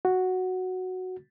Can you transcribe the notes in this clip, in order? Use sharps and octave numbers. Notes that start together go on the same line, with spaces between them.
F#4